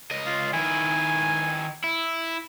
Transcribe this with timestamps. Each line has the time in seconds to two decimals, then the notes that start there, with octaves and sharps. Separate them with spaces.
0.11 C#2 D#5
0.26 F4
0.53 D#3 E4 G#5
1.84 E4